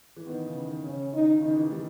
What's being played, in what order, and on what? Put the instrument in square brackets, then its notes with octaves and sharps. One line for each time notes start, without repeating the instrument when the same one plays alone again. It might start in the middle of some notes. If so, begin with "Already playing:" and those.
[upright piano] E3
[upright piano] D#3 [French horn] B3
[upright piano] C#3
D#3
[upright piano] C#3 [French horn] C#4
[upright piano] D#3 [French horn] D#4
[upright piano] C#3
[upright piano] D#3 [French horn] D#4
[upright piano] E3
G3